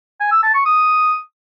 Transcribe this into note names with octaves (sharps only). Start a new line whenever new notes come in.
G#5
E6
A5
C#6
D#6